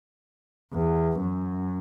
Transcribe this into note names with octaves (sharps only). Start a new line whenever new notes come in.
E2
F#2